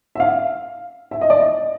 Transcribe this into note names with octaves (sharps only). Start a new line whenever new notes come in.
E5
F5
E5
D#5
D5
D#5